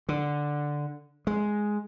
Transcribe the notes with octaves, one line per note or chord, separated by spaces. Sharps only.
D3
G#3